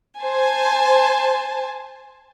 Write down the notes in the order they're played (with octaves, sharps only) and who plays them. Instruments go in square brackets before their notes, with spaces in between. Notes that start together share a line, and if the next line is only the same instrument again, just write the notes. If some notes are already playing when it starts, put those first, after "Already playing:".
[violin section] C5 G#5 A5